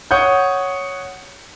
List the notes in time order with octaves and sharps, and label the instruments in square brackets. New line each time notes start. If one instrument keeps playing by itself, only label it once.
[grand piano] C#5 F#5 D#6 G6